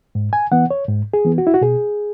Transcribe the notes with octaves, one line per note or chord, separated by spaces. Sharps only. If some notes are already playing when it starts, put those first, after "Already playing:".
G#2
G#5
E3 B3 F#5
C#5
G#2
G#4
E3 B3
F#4
E4
F#4
B2 G#4